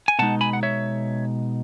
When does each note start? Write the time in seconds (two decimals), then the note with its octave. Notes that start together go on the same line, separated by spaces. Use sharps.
0.08 G#5
0.19 B2 G#3 D#4 F#5 A5
0.41 G#5 B5
0.53 F#5
0.63 C#5 E5